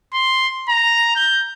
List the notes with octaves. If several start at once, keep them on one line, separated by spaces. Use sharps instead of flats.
C6
A#5
G6